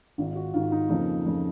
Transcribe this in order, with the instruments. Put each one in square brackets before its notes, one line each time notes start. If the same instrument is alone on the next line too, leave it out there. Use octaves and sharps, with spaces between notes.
[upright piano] G#1 G#2 D#3 F4
F#4
G#1 G#2 D#3 F4
D#4
F2 C#3 F3 A#3 D#4
F2 C#3 F3 A#3